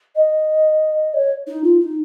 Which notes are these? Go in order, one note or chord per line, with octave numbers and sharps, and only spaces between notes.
D#5
C#5
D#4
F4
D#4